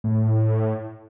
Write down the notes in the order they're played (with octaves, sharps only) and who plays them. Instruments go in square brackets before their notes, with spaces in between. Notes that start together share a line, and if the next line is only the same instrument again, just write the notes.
[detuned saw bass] A2